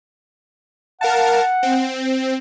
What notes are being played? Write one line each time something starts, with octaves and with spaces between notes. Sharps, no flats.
A#4 F5 F#5 A5
C4